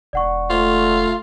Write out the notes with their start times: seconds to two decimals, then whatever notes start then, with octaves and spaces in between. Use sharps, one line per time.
0.13 E1 D5 F#5 C#6
0.50 A3 F4